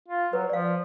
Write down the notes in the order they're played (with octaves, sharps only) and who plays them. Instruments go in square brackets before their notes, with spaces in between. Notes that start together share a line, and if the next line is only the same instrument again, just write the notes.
[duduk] F4
[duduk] F#3 [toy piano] B4
[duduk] F3 [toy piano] D5 F5